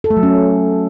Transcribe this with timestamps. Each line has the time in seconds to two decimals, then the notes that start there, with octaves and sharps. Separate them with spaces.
0.04 A4
0.10 A3
0.17 F#3
0.23 C#4